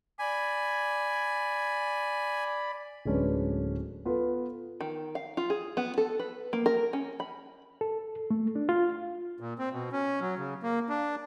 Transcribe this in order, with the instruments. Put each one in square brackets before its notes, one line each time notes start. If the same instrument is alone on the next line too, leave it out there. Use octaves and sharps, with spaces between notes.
[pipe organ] D5 B5 [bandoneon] G#5
[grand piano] D1 G#3 C#4 D4 B4
B3 F4 A4 B4
[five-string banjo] D#3
F5
F4
G#4
B3
A4
B4
A#3
A#4
C#4
B5
[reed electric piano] A4
A3
D4
F4
[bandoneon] A#2
C4
B2
C#4
F#3
C#3
A#3
D4